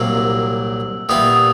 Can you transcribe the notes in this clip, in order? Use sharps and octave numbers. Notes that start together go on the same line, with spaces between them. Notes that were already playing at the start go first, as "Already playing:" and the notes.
Already playing: C2 A#2 F#3 A#3 D4 E6
A#2 G3 B3 E4 D#6